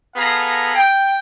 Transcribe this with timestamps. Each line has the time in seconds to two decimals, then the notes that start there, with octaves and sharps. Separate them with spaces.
0.16 B3 G#4 A4 F5 A#5
0.75 G5